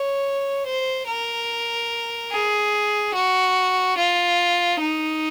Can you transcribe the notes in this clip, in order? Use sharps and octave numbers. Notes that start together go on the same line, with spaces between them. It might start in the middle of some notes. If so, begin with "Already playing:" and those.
Already playing: C#5
C5
A#4
G#4
F#4
F4
D#4